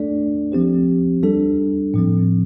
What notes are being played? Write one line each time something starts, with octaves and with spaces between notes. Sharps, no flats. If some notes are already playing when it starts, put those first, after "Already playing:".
Already playing: A3 D4 A4 D5
F3 C4 G4 C5
G3 D4 A4
A2 F3 C4